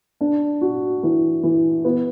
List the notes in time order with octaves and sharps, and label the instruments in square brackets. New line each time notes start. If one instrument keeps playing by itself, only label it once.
[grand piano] D4
F#4
E3
E3
B3